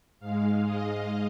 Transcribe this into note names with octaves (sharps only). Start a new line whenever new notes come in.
G#2 G#3 F5
D#5